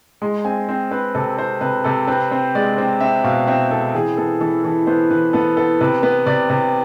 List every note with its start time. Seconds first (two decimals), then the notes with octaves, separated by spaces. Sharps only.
0.22 G#3 C6
0.45 C4 G#5
0.69 C4 C5
0.91 C4 B4
1.15 C3 A4
1.38 C4 C5
1.61 C3 B4
1.84 C3 A4
2.07 C4 B4
2.31 C4 C5
2.55 G#3 D5
2.78 C4
3.01 C4 E5
3.24 B2 F5
3.48 C4 E5
3.71 C4 A4
3.95 E3 G#4
4.17 B3 A4
4.41 E3 A4
4.64 E3 A4
4.87 B3 C5
5.10 E3 B4
5.33 B3 A4
5.57 B3 A4
5.81 C3 B4
6.03 B3
6.26 C3 D5
6.50 C3